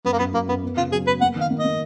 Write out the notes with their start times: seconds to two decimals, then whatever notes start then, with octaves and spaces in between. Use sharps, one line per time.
0.05 F#2 B3
0.13 A#3
0.19 F#2 B3
0.33 F#2 A#3
0.48 F#2 B3
0.63 B3
0.77 C#3 F4
0.92 F#3 G#4
1.06 B3 B4
1.21 A#3 F#5
1.36 D#3 F5
1.50 A#3
1.59 D#5
1.65 A#3